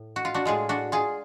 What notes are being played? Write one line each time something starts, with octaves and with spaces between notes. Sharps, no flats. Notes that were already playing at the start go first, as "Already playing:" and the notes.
Already playing: A2
F#4
F4
D4 F#4
A2 G#3 F4 G#4
D4 F#4
F4 G#4